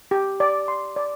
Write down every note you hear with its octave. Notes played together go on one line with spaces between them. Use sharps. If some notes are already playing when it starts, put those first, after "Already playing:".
G4
D5
C6
D5